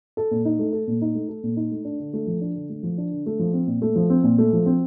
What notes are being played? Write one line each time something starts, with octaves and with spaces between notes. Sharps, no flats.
A4
A#2
D#4
A3
A4
A#2
D#4
A3
A4
A#2
D#4
A3
D4
D3
A3
F3
D4
D3
A3
F3
D4
D3
A3
F3
C4
A#2
A3
F3
C4
A#2
A3
F3
C4